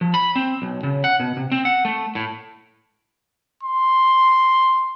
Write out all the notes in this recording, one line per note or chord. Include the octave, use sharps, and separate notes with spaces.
F3
B5
C4
B1
C#3
F#5
B2
C3
C4
F#5
A3
A2
C6